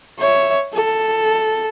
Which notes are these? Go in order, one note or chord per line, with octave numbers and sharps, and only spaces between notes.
C#5 E5
A4